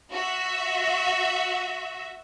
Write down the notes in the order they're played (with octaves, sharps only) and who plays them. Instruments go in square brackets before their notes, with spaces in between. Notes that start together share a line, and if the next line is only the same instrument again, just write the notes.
[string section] F#4 E5